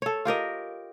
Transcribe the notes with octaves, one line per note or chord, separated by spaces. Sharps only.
A4 C#5
F4 G4 A#4 D#5